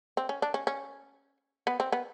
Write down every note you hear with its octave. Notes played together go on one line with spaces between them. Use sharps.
C4
C#4
D4
C#4
C#4
B3
C4
B3